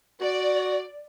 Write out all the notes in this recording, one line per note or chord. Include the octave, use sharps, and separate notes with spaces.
F#4 D5